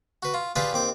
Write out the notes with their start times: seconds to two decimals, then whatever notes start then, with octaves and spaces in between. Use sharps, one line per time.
0.23 F#4 B4
0.34 F4
0.56 F4 G4 G#4 B4 D5 G5
0.73 D#2 C4 D6